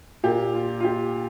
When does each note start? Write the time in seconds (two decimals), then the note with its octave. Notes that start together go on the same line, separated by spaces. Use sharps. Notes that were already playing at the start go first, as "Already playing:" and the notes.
0.23 A#2 A#3 G4
0.54 F4
0.80 F4
0.84 G4